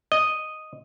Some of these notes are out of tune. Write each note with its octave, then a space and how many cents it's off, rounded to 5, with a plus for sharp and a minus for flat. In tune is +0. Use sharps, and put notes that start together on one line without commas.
D#5 +0